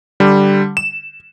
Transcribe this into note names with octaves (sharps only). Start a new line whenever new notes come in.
D3 G3
E7